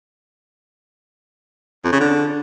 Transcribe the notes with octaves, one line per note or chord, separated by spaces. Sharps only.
F2
C#3
D3